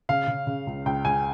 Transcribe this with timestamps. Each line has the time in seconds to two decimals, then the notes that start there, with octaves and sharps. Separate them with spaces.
0.09 C#3 F5
0.28 C#3
0.47 C#3
0.67 C#2
0.86 C#2 G5
1.05 C#2 G#5